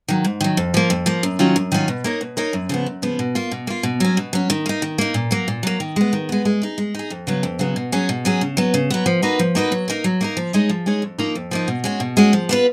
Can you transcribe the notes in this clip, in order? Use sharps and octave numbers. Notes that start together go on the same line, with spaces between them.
D#3 F#3
G#2
D#3 F#3
F2
F3 A#3
F2
F3 A#3
F#2
D#3 F#3 C#4 F4
F#2
D#3 F#3 C#4 F4
B2
A#3 D#4 A#4 C#5
B2
A#3 D#4 A#4 C#5
F#2
C#3 F3 B3
F#2
C#3 F3 B3
B2
A#3 F4
B2
A#3 F4
B2
F#3 C#4
B2
F#3 C#4
D#3
A#3 D#4
D#3
A#3 D#4
A#2
F#3 A#3
A#2
F#3 A#3
D#3
G#3 B3
D#3
G#3 B3
G#3
D#4 G#4
G#3
D#4 G#4
F2
C#3 F#3 B3
F2
C#3 F#3 B3
B2
F#3 C#4 G#4
B2
F#3 C#4 G#4
C#3
F#3 B3
C#3
F#3 B3
F3
A#3 D#4 F#4 B4
F3
A#3 D#4 F#4 B4
F#3
A#3 D#4 A#4
F#3
A#3 D#4 A#4
F3
G#3 D#4 G#4 C#5
F3
G#3 D#4 G#4 C#5
F2
F3 A#3 D#4
F2
F3 A#3 D#4
B2
G#3 C#4 F#4
B2
G#3 C#4 F#4
F3
B3 F4 G#4 B4